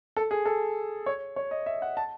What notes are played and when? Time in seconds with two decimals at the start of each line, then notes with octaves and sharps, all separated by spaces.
0.17 A4
0.31 G#4
0.46 A4
1.06 C#5
1.36 C#5
1.51 D#5
1.66 E5
1.82 F#5
1.97 A5